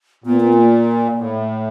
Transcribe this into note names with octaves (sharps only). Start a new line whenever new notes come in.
A#2 B3
B3
B3
A#3
A2